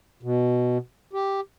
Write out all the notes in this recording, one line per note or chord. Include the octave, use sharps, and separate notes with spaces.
B2
G4